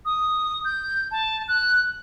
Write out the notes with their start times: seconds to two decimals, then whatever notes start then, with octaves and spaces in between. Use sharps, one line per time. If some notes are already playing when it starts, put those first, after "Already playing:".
0.05 D#6
0.65 G6
1.11 A5
1.48 F#6